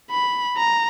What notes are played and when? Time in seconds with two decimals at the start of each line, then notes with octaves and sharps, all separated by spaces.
0.11 B5
0.57 A#5